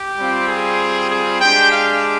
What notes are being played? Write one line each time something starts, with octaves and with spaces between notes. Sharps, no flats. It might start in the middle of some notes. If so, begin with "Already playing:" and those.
Already playing: G4
G3 C4 F4
G#4
G#4
G#3 D4 G4 G5
F5